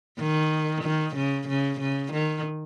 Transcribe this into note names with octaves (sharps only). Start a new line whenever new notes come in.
D#3
D#3
C#3
C#3
C#3
D#3